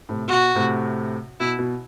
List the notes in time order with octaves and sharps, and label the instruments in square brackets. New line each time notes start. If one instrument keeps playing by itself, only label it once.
[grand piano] A2 C3
[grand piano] B2 [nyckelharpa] F#4
[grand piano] A2 C3
[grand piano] B2 [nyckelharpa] E4
[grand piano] B2